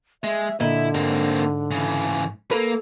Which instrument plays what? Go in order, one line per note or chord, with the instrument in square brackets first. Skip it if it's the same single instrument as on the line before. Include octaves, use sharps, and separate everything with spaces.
[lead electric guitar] G#3 [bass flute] E5
[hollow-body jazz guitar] A#2 D#5 [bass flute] D3 [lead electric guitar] E4
[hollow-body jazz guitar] G#2 [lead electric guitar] A#3 C4
[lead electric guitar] C#3 E3
[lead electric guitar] A#3 [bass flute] A4 [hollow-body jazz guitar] B4